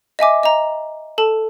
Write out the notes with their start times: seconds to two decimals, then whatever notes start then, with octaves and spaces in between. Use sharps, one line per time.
0.19 D#5 E5 G#5 D6
0.43 D#5 A#5
1.18 A4 A5